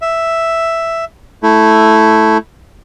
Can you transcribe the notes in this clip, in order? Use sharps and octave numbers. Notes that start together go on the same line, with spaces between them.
E5
A3 E4